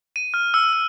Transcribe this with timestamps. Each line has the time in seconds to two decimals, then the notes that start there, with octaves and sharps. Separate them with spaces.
0.16 D#7
0.34 F6
0.54 E6
0.73 E6